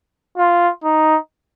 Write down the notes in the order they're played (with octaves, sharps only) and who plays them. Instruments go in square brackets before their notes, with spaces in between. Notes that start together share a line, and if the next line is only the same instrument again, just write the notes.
[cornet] F4
D#4